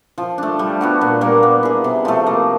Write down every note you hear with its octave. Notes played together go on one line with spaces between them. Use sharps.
F3
A3 D4
G3
B3 D4 F#4
A#2
G3 A#3
B3
E4 G#4
C3
F3 A3
A#3